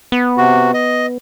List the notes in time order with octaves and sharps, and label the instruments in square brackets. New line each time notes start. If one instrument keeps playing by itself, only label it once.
[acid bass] B3
[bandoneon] C3 F#4
D#5